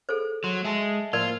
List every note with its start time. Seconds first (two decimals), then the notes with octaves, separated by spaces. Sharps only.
0.09 G#4 A4 C5
0.44 F#3 C6
0.65 G#3 E5 G#5 A5
1.13 A2 F3 A#3 F4 A#4 D5